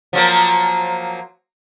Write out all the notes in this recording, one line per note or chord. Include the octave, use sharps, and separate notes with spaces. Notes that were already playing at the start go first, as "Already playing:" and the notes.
F3 F#3 A#3